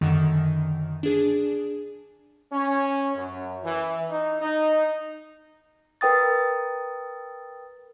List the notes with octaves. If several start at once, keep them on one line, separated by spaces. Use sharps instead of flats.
F#2 D3 D#3
D4 G#4
C#4
F#2
E3
D#4
D#4
A#4 B4 G5 D#6 A6